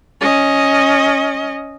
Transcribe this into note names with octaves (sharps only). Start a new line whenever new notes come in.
C#4 D#5